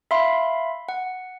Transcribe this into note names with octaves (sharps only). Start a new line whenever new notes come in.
E5 F5 B5 C6
F#5